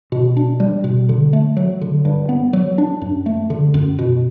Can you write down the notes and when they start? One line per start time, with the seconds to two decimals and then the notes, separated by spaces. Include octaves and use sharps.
0.12 B2
0.37 D4
0.60 G3
0.84 B2
1.09 D3
1.33 A3
1.57 F#3
1.81 D3
2.05 G2
2.29 B3
2.53 F#3
2.78 D4
3.02 F#2
3.26 A3
3.50 D3
3.74 F#2
3.99 B2